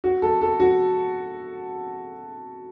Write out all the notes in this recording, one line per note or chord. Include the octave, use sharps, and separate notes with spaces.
F#4
A4
A4
F#4